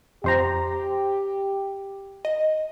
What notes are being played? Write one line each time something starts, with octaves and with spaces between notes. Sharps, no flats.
F2 G4 C5 A#5
D#5